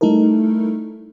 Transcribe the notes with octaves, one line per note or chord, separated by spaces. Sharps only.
G3 A3 D#4 E4 A4 A#4